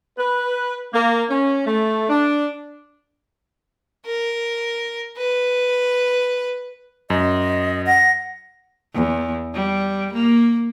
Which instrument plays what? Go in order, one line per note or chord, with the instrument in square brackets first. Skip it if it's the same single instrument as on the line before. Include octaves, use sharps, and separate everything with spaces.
[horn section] B4
A#3
C#4
A3
D4
[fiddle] A#4
B4
[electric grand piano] F#2 [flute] D#5
[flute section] F#5 [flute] A#6
[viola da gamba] E2
G3
A#3